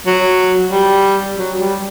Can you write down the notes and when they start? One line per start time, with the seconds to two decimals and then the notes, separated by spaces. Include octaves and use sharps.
0.06 F#3
0.71 G3
1.37 F#3
1.60 G3